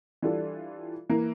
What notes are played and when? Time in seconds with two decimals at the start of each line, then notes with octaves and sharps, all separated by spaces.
0.22 E3 G3 D4 F4 A4
1.09 E3 A#3